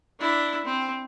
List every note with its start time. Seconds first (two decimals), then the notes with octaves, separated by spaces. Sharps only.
0.20 D4 E4
0.65 C4